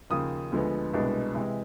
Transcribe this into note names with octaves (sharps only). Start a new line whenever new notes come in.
D#2 C#3 F3 D#6
D2 D3 F3 G#3 B3
C2 B2 G#3 B3 D4
C3 E3 G#3